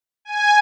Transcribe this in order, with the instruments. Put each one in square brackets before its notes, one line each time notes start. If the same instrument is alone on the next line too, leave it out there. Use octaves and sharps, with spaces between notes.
[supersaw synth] G#5